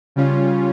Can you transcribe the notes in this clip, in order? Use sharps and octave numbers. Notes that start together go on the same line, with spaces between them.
C#3 G3 C#4 F4